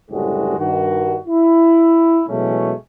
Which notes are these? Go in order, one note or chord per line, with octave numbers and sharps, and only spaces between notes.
F#1 D2 A2 G3 G#3 F#4
G2 D#3 F#4
E4
B2 E3 F#3 G#3 A3 C#4